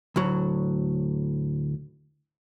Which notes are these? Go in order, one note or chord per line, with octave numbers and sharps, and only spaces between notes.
D2 A2 F#3